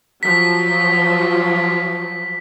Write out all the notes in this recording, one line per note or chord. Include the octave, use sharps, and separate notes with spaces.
F3 F#3 B6